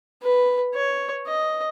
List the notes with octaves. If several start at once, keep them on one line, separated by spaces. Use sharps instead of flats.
B4
C#5
D#5